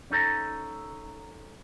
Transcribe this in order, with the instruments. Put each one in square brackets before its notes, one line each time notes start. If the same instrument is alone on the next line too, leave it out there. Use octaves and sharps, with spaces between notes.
[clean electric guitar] C#4 D#4 A4 A#5